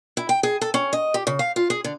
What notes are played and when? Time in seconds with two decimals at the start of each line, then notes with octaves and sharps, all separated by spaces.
0.17 E4
0.29 G5
0.43 G#4
0.61 A4
0.74 C#4
0.93 D#5
1.14 G4
1.27 C#3
1.39 F5
1.56 F4
1.70 G#4
1.84 D3